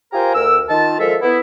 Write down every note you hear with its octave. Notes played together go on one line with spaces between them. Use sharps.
F4 G4 A#4 C5 G#5 A#5
D2 A#4 E6
D#3 F4 A5
F3 G#3 A4 A#4 E5
B3 E4